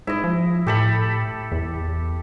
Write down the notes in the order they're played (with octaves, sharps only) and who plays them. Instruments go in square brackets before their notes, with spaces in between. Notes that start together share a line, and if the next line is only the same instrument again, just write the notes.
[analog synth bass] G#2 [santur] E4 D#5
[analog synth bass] F3
[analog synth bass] A2 [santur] G4 A4 B5
[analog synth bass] E2